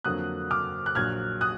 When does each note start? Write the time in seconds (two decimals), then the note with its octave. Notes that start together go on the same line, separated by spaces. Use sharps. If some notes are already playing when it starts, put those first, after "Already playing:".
0.04 F2 D3 F#3 A#3 D#6 F#6
0.51 D6 F6
0.86 F#6
0.95 A#1 A#2 F#3 F6 G#6
1.41 D#6 F#6